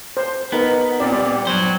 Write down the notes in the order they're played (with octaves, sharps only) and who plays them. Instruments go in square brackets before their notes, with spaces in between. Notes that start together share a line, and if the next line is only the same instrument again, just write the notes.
[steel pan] C5
[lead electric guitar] B3 [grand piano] D#4 A#4 B4
[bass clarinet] A#2 [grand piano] C4 [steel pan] D5
[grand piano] G3 [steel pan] D5
[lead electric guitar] G2 C5 [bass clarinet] F#3